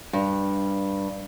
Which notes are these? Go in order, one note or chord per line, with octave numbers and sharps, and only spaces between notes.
G2